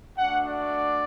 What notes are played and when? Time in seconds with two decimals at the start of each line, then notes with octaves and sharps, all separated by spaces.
0.18 A3 D4 F#4 F#5
0.47 D5